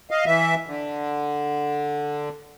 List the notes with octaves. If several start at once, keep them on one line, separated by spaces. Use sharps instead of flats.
D#5 F5
E3 E5
D3